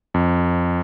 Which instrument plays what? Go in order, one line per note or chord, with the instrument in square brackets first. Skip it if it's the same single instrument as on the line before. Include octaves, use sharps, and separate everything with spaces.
[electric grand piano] F2